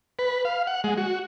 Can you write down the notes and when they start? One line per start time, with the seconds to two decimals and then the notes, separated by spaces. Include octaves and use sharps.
0.19 B4
0.45 F5
0.67 F#5
0.84 G#3
0.97 F#4